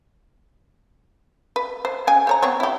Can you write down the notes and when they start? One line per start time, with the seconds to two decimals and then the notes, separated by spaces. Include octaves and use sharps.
1.56 B4
1.85 C5
2.07 C#3 G#5
2.27 C5 C#5 A#5
2.42 B3 C4 C#5
2.60 E4 G4